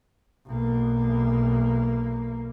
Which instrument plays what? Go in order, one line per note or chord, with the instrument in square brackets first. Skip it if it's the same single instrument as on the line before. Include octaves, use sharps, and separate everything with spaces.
[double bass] B1 A#3